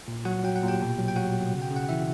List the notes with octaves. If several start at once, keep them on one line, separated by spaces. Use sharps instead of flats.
A#2
F#3 F#4 F#5
F#3 G5
F#5
A#2
G4 G5
B2
F#3
G5
F#3 F#4 F#5
B2
C#3
G5
C#3
F#5
E3 E4 E5